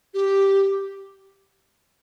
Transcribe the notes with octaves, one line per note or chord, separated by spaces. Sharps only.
G4